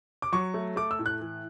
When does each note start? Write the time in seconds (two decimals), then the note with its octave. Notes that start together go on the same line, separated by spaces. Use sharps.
0.22 D6
0.32 F#3 C#6
0.54 A3
0.76 A3 D6
0.91 E6
0.99 A2
1.06 F#6
1.21 E3